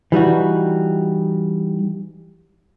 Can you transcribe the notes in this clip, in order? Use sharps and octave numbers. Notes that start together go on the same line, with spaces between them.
E3 G3 D#4 F#4